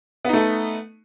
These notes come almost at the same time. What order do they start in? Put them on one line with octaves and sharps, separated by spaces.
B3 D#4 A3